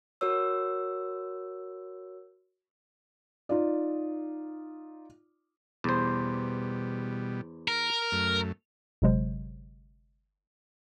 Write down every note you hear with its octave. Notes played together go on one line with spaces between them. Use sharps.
F#4 A#4 C#5 E6
D#4 F4 D5
E2 B2 G3 C5
A#4
F#2 A3
G1 C3 F#3 G#3 C5